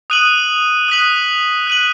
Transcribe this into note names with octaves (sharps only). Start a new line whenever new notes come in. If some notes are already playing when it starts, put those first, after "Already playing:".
D#6 F#6 D#7 F#7
D#6 F#6 B6 F#7
F#6 D#7 F#7